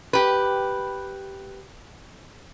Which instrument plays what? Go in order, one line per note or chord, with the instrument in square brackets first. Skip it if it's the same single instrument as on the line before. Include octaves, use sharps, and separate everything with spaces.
[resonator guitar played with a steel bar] G4 B4